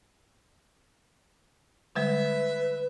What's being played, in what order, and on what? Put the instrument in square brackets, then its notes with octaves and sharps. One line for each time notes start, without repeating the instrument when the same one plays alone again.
[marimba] D3 G3 G#3 [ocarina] B4 [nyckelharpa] E5